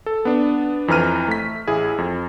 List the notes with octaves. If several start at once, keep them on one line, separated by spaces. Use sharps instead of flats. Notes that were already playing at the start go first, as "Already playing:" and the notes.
A4
B3 D4
F2 E3 B4 A#5 F6 D#7
A3 B6
A1 E4 G#4
F2